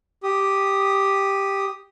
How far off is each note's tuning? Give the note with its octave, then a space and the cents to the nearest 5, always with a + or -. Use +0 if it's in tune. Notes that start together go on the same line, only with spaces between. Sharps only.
G4 +0 D#6 -5